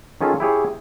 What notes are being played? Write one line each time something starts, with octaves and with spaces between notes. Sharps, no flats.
D#3 C#4 F4 G#4 A4
E4 G4 G#4 C#5